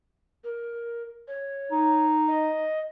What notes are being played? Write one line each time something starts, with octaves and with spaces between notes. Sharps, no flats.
A#4
C#5
D#4
D#5